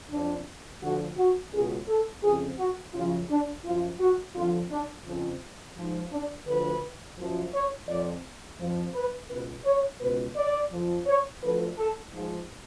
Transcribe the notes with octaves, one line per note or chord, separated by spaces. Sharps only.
F2 F3 D4
D2 D3 F3 F#4
F#4
C#2 B2 G#4
A4
F2 C#3 F3 G#4
F#4
F#2 C#3 F3 F4
D4
F#2 F3 F4
F#4
F2 D3 F3 F4
D4
F2 C#3 F3
G#2 F3
D4
D2 D3 F3 B4
F#2 F3
C#5
F2 F3 D5
F2 F3
B4
C#2 B2 B4
C#5
C#2 B2 B4
D5
F2 F3
C#5
D2 D3 F3 B4
A4
G#2 F3